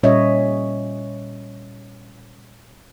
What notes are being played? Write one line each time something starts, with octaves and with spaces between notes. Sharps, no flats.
A#2 G3 C#4 C#5 D#5 E5